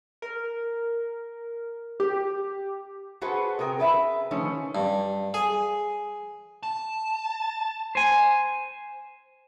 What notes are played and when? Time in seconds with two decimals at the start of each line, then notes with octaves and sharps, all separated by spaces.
0.22 A#4
2.00 G4
3.22 F#4 G#4 A4 B4 C5 F#5
3.59 C3 G#4 A#4 G5
3.79 G#4 B4 D#5 E5
4.31 D#3 F3 A3 C#4
4.75 G2
5.34 G#4
6.63 A5
7.95 C5 G#5